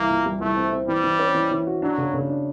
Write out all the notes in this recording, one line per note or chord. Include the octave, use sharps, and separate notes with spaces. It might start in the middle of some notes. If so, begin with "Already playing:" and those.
Already playing: C2 E3 A#3
A#2
G3
C2 A3
C4
C4
E3 G3
E3
C#4
E3
E3
F#4
F#3 D4
C#3
C#3
D4